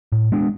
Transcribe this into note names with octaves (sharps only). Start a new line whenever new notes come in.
A2
G#3 B3 D4